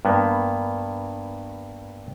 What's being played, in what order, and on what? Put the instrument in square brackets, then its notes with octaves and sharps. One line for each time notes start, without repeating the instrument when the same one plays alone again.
[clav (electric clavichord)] G2 A#3 B3